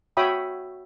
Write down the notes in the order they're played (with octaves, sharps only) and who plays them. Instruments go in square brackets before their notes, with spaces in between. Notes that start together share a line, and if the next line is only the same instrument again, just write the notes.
[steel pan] F#4 C#5 E5 G5 B5 D#6